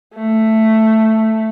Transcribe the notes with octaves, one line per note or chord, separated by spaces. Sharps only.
A3